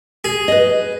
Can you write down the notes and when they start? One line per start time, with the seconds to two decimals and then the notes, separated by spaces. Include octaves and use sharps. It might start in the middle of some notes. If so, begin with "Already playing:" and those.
0.24 G#4
0.48 B4 D#5